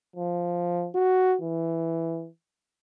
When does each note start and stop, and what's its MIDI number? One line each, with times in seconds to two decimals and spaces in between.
0.16 0.88 53
0.95 1.36 66
1.41 2.28 52